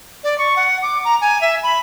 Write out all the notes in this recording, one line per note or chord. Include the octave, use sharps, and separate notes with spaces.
D5
C#6
F#5
D6
A#5
G#5
E5
B5